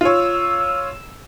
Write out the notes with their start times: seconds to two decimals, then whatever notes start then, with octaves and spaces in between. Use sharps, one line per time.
0.01 F4 C#5 E6